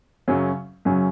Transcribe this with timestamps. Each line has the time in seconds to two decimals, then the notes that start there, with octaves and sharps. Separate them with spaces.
0.28 F#2 C#3 F#3 C#4
0.85 F#2 C#3 F#3 C#4